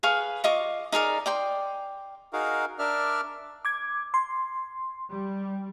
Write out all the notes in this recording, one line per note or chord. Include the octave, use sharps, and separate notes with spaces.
G#4 B4 F5 C#6
F4 D#5 C#6 D6
D#4 G#4 A#4 D5
D5 G5 C6
D#4 F#4 G#4 A#4 F5
D4 A#4 D5 E5 F6
D6 G#6
C6
G3